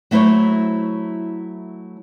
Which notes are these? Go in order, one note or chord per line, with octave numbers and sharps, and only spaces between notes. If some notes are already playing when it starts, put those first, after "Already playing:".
F#3 A3 E4 C5 C#5